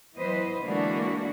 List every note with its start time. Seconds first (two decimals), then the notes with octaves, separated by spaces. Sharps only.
0.17 E3 F#3 B3 B4 C5 D#5
0.63 D3 E3 G#3 A#3 D4 F#4